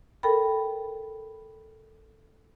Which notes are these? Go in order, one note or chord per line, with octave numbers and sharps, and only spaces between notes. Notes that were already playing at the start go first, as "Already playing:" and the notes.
A4 A#4 G5 B5